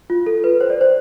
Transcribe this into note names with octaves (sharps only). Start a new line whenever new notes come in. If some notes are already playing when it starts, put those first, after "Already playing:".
F4
A4
B4
C5
D5
C5